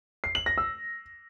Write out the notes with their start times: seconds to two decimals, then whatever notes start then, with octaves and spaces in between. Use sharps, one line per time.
0.24 C7
0.35 F#7
0.46 A#6
0.58 E6